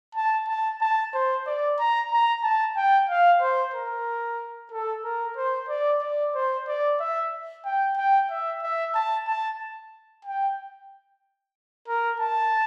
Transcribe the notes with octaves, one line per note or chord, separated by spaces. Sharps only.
A5
A5
A5
C5
D5
A#5
A#5
A5
G5
F5
C5
A#4
A4
A#4
C5
D5
D5
C5
D5
E5
G5
G5
E5
E5
A5
A5
G5
A#4
A5